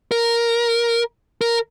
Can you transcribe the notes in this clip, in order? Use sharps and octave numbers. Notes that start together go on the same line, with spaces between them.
A#4
A#4